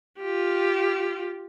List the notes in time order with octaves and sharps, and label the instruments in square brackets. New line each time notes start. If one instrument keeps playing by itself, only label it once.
[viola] F4 G4